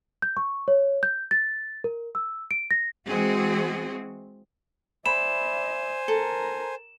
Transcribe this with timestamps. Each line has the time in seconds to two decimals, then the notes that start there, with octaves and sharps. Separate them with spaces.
0.22 G6
0.37 C#6
0.68 C#5
1.03 G6
1.31 A6
1.84 A#4
2.15 E6
2.51 D7
2.71 A#6
3.08 E3 G#3 C4 F#4 G#4
5.06 C5 D5 E5 G#5 B5 E7
6.08 A4 A#4 A#5